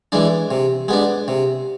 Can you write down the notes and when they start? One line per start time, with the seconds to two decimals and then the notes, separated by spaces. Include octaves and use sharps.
0.12 E3 G#3 D4
0.51 C3
0.88 G#3 B3 D4
1.28 C3